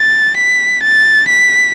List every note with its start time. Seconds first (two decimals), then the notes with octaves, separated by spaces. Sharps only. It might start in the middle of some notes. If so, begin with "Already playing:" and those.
Already playing: A6
0.37 B6
0.83 A6
1.29 B6